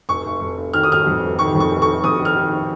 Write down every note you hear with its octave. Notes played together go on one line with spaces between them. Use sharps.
F1 C#6
F1
F1
F1
D#3 F6
D#6
D#3 F6
F2
F1
D#3 C#6
F2
C#6
F1
C#6
F1
F2 D#6
D#3
F6
D#3